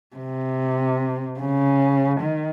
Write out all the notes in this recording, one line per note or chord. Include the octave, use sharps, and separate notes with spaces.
C3
C#3
D#3